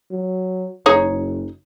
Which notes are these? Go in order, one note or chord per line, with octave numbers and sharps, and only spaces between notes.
F#3
F#1 D#4 G#4 C#5